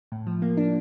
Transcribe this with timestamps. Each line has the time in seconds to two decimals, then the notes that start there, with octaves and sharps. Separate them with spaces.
0.12 A2
0.27 F3
0.42 A#3
0.57 D4